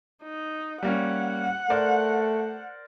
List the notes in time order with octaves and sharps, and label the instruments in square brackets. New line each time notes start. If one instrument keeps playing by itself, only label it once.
[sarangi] D#4
[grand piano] G3 A#3 C#4 [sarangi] F#5
[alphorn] A3 [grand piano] A#4 C5 D5